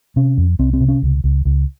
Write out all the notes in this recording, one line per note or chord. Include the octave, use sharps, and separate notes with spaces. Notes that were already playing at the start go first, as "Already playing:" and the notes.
C3 C#4
F2
C2 C4
C4
C3
C#4
C#2
C#2
C#2